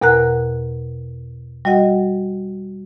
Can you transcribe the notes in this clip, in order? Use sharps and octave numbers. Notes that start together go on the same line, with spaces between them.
E2 B2 A#4 F#5 A#5 F#6
G3 F#4 D#5 F#5